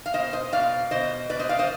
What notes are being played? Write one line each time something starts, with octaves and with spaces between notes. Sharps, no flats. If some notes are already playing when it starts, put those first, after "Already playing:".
F5
B2 C5 D#5
C5 D#5
B2 D5 F5
B2 C5 D#5
B2 B4 D5
C5 D#5
D5 F5
C5 D#5